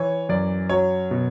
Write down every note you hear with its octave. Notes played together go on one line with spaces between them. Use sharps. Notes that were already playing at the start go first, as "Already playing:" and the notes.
Already playing: E3 C#5
F#2 D5
F#3 C#5
B2